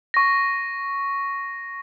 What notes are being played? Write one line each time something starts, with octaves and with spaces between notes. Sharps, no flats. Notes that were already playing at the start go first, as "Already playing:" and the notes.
C#6 A#6